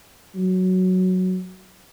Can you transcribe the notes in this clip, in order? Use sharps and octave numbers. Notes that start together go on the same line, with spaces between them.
F#3